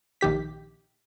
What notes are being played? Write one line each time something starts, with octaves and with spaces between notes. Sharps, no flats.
A#1 D#3 G4 B6